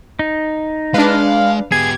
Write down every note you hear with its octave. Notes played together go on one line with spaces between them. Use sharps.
D#4
G#3 D4 B4 F5
B3 G4 G#4 G#6